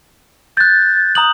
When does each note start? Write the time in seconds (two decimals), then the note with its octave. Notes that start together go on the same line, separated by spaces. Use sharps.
0.57 F#6 G6 A6
1.15 A#5 D#6 F#7